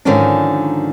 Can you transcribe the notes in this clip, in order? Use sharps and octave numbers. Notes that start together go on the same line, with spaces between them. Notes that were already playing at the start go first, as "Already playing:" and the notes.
G#2 D3 D#3 F3 C#4 D4